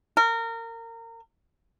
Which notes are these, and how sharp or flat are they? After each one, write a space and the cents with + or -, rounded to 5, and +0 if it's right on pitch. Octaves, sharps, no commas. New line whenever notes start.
A#4 -25